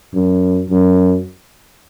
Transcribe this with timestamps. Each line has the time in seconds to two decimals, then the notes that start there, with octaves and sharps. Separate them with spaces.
0.14 F#2
0.69 F#2